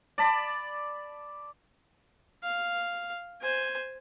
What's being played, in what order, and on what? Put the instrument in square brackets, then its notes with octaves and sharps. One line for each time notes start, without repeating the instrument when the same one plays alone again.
[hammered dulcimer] D5 A5 B5
[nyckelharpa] F5
C5 G#5